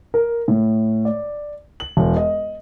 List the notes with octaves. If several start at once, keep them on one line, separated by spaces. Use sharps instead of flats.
A#4
A2
D5
F#7
E1
D#5